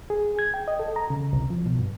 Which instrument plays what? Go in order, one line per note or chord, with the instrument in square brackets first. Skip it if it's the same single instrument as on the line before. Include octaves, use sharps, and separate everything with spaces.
[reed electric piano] G#4
G#6
G5
D#5
A4
A#5
C#3
C2
F3
B2
G2